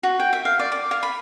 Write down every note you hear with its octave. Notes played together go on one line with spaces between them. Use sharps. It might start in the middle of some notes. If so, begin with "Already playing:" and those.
F#4
G5
E5
F5
D5
D6
F5
B5